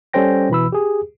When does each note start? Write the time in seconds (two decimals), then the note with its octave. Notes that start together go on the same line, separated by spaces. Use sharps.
0.13 G3 C#4 A4 C5 G5 A#6
0.50 B2 E3 B5 E6
0.72 G4 G#4